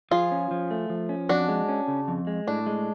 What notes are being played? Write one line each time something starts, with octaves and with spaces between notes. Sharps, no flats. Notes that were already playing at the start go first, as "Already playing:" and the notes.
F3 F4 G#4
C#4
F3
A3
F3
C#4
F2 D4 F#4
G#3
C#4
C#3
F2
G#3
A2 D4
G#3